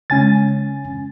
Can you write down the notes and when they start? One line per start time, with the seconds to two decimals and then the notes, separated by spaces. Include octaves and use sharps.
0.10 C#3 G#3 C#4 G#5 A6